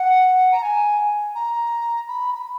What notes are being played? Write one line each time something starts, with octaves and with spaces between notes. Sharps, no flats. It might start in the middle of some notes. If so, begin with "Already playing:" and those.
Already playing: F#5
A#5
G#5
A#5
B5
B5